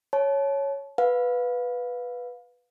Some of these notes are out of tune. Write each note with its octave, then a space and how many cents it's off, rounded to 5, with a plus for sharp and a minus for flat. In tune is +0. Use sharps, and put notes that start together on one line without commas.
C#5 +0 A5 -30
B4 +0 F5 +25